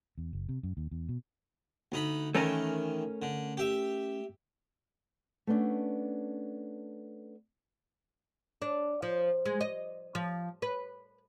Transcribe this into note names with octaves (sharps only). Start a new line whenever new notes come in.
E2
F#1
C3
F#2
D#2
E2
B2
D2 D#4 B5
D#3 E3 A3 C#4 A#4
D3
G4 E5
A3 B3 C#4 D4
D4
F3
G#3
D#5
F3
B4